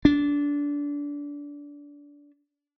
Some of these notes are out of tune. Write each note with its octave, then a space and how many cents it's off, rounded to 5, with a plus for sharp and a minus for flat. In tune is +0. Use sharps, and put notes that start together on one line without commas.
D4 -20